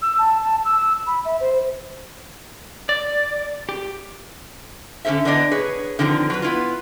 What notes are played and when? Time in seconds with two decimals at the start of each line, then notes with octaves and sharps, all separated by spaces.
0.02 E6
0.19 A5
0.42 A5
0.65 E6
1.07 B5
1.25 E5
1.40 C5
2.89 D5
3.69 G4
5.05 D3 C#4 A4 C5 E5
5.25 D3 E3 B3 D4 D5 D#5
5.51 G#4 B4 C#5
5.99 D3 D#3 F3 C4 D4
6.30 F#3 B4
6.42 B3 E4 F4